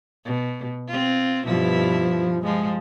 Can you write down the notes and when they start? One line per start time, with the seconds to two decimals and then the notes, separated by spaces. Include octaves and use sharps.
0.25 B2
0.88 C4 F4
1.46 G2 B2 F3 E4
2.44 F3 G#3